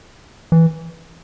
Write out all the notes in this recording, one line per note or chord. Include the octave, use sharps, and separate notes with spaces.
E3